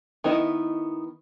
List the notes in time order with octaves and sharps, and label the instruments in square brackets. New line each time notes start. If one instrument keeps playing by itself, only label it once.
[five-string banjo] D#3 B3 E4 D#5